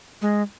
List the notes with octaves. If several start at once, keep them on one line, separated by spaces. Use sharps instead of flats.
G#3